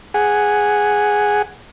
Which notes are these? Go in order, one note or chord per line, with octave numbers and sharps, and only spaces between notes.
G#4 F#5 G#5